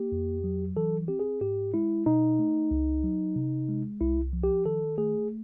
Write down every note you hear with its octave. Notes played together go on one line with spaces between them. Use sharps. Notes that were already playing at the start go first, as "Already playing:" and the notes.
Already playing: A#3 G4
F2
F#3
E3 A4
C4 G4
G#4
G#2 G4
G#3 E4
B2 D#4
A3
C#2
F#3
C3
G#3
C2 E4
F3
G4
D#3 A4
A3 G#4